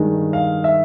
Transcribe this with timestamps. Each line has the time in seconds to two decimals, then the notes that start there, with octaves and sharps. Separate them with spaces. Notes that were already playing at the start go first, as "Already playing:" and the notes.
Already playing: G2 D#3 G#3
0.33 F5
0.64 E5